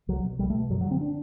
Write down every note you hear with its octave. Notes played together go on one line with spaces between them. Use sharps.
C2 F#3
B2
C2 G3
A3
B2
F#2 F#3
F#3
D3
C4
D4